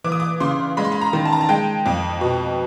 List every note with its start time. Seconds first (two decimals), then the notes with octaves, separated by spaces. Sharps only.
0.04 E3 D6
0.12 D#6
0.20 D6
0.40 C#3 C6
0.77 G#3 B5
0.85 C6
0.92 B5
1.01 A#5
1.13 D#3
1.25 A5
1.32 A#5
1.41 A5
1.49 G#3 G5
1.86 F2
2.21 B2